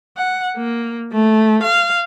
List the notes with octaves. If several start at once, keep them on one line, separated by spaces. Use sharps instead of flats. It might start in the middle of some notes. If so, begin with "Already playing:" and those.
F#5
A#3
A3
F5